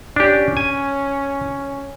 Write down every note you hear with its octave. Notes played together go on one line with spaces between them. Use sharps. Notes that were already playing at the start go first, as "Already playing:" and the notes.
C#4 D4 G4
G#5